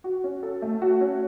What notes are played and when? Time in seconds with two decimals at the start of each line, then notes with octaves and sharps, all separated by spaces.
0.04 F#4
0.24 C#4
0.43 A4
0.62 A3
0.82 F#4
1.01 C#4